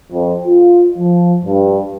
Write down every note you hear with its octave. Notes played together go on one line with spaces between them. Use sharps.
F2
F4
F3
G2